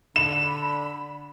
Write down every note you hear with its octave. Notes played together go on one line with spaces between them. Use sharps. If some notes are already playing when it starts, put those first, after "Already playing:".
D3 D4 B5 E7